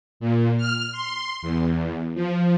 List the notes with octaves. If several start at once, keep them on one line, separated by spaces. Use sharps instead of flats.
A#2
F6
C6
E2
F3